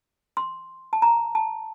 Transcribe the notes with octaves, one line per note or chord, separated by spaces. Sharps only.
C6
A5
A#5
A5